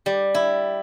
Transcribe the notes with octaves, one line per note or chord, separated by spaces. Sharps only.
G3
E4